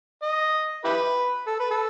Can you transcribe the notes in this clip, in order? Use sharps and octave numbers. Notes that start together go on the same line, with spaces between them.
D#5
E4 G4 B4
A4
B4
A4